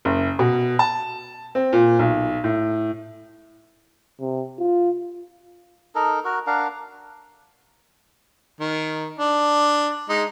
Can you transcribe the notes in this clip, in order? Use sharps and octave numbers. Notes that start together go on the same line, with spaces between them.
F#1
B2
A5
C4
A#2
B1
A2
C3
F4
D#4 A4 A#4
F#4 A#4
D4 A#4 F5 F#5
D#3
D4
G#3 D#4